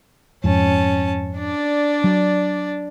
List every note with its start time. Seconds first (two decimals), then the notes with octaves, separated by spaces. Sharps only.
0.44 F2 G#2 C#4 A5
1.37 D4 D5
2.04 F#3